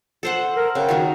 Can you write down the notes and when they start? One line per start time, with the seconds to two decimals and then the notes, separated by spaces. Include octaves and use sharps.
0.23 A4 C5 F#5
0.56 A#4
0.75 C#3 A4 F#5 G5
0.89 D#3 F#4 A#4